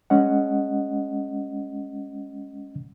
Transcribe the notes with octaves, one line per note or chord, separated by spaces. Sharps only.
G#3 C#4 D#5 F#5